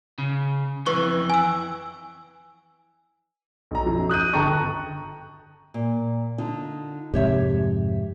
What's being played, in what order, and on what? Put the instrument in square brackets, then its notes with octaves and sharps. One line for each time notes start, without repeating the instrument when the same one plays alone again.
[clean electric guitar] C#3
[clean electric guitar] F2 G#2 E3 [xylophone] B4 C#6 G7
[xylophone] G#5 E6
[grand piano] B1 A#5
F#2 F3 F#3
D#6 F#6 G6 D#7
G1 G5 A5 A#5 C#6 F#6
[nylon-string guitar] A#2
D3 D#4 F4
[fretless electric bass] F2 G#2 C3 [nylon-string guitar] G4 C#5 E5